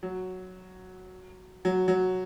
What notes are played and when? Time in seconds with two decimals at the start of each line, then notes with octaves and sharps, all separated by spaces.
0.03 F#3
1.65 F#3
1.88 F#3